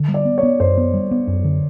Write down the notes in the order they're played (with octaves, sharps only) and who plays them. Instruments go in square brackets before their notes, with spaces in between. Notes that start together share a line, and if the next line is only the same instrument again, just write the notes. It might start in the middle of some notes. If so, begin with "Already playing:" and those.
Already playing: [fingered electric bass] D3
G3
[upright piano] D5
[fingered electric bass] B3
[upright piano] C#5
[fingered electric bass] B3
[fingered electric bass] F#2 [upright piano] C5
[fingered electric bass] B3
G3
B3
F#2
D3